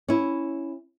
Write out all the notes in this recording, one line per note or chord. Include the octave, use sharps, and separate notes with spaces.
C#4 E4